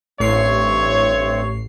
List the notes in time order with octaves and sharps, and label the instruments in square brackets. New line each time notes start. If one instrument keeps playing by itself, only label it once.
[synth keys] A1 C7 [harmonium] G2 A3 C4 [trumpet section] C#5